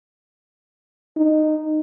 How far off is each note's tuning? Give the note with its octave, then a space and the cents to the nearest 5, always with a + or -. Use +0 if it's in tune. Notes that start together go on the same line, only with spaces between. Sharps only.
D#4 -10